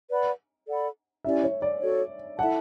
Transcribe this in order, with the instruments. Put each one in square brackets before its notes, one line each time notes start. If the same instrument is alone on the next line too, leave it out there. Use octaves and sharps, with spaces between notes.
[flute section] B4 D5 F#5 B5
A4 D5 F#5 B5
[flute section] C#4 E4 G4 D5 [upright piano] E5
[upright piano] C#5
D5
[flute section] F#4 A4 C#5
[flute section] E4 A4 E5 A5 [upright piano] F#5